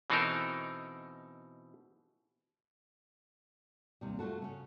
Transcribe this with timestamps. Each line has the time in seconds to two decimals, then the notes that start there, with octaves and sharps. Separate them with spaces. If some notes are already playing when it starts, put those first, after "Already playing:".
0.10 B2 E3 C4 D#4 A4 A#4
4.01 D#2 C3 G3
4.19 C3 A3 F4 F#4 A4
4.42 C#3 C#4